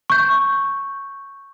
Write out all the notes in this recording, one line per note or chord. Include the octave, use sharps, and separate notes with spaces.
C#6 G6